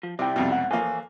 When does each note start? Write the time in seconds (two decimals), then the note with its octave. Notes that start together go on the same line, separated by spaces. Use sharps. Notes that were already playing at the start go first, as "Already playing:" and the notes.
0.03 F3
0.19 C3 G3 E4 G5
0.36 C2 F2 B2
0.52 C#2 F#5
0.71 E3 F3 A#3 A4 G#5